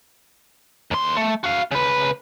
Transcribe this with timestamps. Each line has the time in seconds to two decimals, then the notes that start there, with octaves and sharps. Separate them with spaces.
0.91 D#2 C6
1.17 A3
1.44 F#4 F5
1.71 C#3 B4